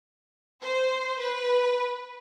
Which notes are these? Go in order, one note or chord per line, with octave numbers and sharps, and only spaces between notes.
C5
B4